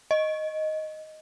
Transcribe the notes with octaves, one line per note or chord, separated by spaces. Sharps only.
D#5